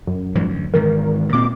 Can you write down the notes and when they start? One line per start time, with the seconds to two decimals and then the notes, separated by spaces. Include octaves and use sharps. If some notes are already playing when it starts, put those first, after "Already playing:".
0.07 F#2
0.35 G#2 E3 F3
0.49 D2
0.74 G#2 D#3 E3 A#4
1.33 A#2 C4 D6